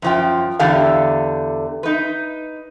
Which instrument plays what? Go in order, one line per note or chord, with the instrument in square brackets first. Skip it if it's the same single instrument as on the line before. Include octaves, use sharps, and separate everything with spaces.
[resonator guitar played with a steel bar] F#2 F3 G5
E2 D3 G4 A4 F5
D#4 B4